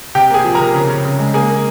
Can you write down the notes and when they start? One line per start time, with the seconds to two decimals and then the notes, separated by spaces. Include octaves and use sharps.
0.15 C3 G4 G5
0.30 A#3 G#4 G#5
0.44 F3
0.55 C3 A#4 A#5
0.74 C#3
0.89 C#3
1.05 C#3
1.19 G#3
1.34 A#3 G#4 G#5
1.49 A#3